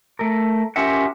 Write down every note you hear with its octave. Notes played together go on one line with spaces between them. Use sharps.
A3 A4 A#4
C#4 F4 G4 A#4 E5 F#5